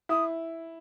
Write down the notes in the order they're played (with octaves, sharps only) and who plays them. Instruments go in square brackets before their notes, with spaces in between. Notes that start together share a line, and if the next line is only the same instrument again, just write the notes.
[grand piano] E4 [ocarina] D#6